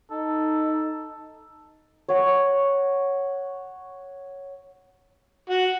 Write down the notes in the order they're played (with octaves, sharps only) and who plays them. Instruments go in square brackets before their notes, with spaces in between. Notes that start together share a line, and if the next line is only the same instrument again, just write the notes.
[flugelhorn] D#4 [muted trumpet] A4
[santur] C#5 F#5
[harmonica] F#4